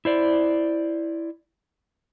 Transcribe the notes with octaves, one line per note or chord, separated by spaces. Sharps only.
E4 C5 D5